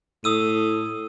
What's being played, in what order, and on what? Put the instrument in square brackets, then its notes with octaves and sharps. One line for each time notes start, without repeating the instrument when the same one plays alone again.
[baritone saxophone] A2 [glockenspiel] D#6 E6 D#7